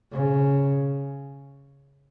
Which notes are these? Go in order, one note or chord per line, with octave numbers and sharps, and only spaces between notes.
C#3